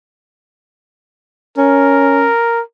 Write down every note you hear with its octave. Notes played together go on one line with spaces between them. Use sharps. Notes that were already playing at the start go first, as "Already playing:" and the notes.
C#4 A#4